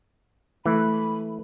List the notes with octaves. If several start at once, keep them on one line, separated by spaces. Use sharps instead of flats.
E3 A3 B5